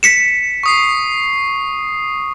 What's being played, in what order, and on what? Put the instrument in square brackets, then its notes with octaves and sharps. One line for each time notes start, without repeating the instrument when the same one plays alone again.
[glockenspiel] B6 C#7 E7
[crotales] C#6 D#6 C7